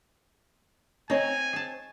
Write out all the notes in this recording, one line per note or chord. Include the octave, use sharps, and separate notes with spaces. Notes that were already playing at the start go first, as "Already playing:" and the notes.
C4 D#4 C#5 G#5
G#4 A5